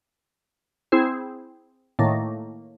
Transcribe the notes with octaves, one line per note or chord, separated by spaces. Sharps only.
C4 E4 G#4 C5
A2 D#3 A3 A#3